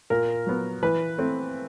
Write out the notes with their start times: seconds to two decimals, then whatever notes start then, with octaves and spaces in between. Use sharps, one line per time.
0.10 A#2 A#4
0.46 F#3 B3
0.83 E3 B4
1.18 A3 C4